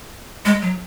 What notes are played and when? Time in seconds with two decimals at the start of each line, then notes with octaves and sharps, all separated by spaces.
0.45 G#3
0.62 F#3